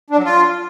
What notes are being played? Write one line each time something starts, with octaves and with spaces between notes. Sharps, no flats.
D4
F#3
F4